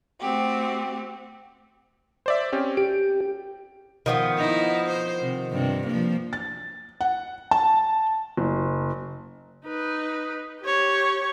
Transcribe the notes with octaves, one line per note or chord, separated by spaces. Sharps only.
A3 C4 F#4 G4
C5 D5 E5
C4 C#4 G4
G4 D7
D#3 F3 B3
D#4 E4
C5
C3
G2 C3
F3 A#3
A6
F#5
A5
F#1
D#4 B4
G4 C#5